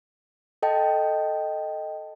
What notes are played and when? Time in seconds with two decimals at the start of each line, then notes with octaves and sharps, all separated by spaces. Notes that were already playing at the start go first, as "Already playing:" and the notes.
0.63 A4 D#5 G5 A5